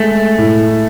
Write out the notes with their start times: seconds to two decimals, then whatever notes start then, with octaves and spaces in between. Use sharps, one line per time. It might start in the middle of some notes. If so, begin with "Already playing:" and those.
Already playing: G#3 A3
0.38 A2